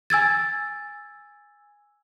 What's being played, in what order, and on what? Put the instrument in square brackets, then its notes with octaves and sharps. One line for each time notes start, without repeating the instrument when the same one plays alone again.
[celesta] G#5 E6 G#6 A6